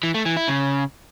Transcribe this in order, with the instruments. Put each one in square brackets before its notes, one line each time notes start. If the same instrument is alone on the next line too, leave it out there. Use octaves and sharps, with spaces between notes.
[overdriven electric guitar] E3
A3
E3
E4
C#3